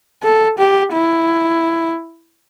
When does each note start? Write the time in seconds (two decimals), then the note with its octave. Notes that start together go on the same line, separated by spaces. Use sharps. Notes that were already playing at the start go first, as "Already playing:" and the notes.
0.23 A4
0.58 G4
0.92 E4